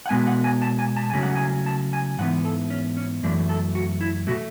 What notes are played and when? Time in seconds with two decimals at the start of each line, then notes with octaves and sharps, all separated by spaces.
0.06 F#5
0.09 B2 G#3 B3 G#5
0.27 F#5
0.44 G#5
0.62 A5
0.79 G#5
0.97 A5
1.10 C#3 F#3 A3 C#4 G#5
1.23 F#5
1.35 G#5
1.66 A5
1.93 G#5
2.18 G#2 E3 B3 F#5
2.45 A4
2.70 C#4
2.97 C#4
3.23 F#2 E3 A3 D4
3.49 A4
3.75 F#4
4.01 E4
4.27 B2 A3 F#4